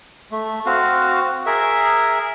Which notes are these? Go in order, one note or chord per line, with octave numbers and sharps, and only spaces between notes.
A3
C4 F#4 F5
G#4 A#4 E5